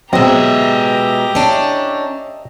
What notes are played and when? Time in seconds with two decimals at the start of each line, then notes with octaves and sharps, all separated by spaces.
0.13 B2 F#3 G#3 C4 G4 D#5 E5 A#5
1.35 C#4 D4